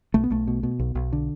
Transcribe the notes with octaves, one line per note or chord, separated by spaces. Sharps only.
B1 A3
B3
B1 A3
B2
B2
B1
B1
D3